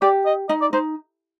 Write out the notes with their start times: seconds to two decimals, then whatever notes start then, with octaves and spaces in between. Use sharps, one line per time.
0.02 G4 D5
0.26 D#5
0.49 D#4 D#5
0.61 D5
0.73 D#4 C5